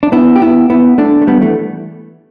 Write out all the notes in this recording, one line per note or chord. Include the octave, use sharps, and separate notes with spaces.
D4
B3 E4
G4
B3 E4
B3 E4
A3 D4
A3
G3 B3
E3 A3